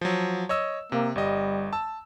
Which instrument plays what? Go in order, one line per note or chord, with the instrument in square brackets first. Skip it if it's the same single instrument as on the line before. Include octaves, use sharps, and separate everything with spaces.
[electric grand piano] F3 F#3
C#5 D#5 E6
[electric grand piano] C3 [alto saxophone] A#3
[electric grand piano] G1 D#5 [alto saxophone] G3
[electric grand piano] A5 E6